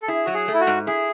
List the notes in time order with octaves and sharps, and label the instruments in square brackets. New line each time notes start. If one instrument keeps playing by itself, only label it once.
[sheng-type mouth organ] A4
[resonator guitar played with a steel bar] E4 [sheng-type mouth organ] G#4
[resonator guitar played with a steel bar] F#3 [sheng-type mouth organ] F#4
[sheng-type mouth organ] G#4
[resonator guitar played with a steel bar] A3
[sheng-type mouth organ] E4
F#4
[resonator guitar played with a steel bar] G#2
[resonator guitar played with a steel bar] E4 [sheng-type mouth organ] G#4